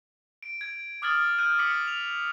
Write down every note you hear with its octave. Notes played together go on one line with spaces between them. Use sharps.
D7
G#6
D6 D#6 F6 G#6 A6 F#7
F6 G6 D#7
D6 B6 C#7 F#7
F7